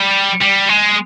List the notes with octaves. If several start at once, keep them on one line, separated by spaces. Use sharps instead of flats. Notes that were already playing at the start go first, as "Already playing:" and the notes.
Already playing: G3
G3
G#3